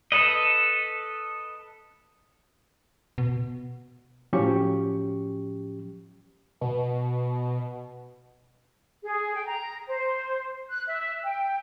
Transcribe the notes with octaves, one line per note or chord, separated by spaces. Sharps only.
A4 B4 D#5
B2
A2 F3 F#3 C#4 G4 C#6
B2
G#4
G5
A#5
C5
F#6
E5
G5